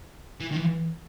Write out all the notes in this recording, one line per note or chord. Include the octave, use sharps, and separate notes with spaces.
E3
D#3
E3